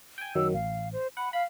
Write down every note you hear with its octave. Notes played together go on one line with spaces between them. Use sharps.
G5 G#5
F#2 D#3 F#3 E6
A1 F5
C5
F#5 B5
F5 B5